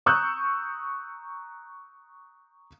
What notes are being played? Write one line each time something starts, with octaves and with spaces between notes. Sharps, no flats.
A#5 C#6 D#6 E6 F#6 G6